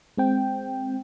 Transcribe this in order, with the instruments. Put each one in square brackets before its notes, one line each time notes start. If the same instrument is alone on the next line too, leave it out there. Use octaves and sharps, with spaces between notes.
[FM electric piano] G#3 C4 G5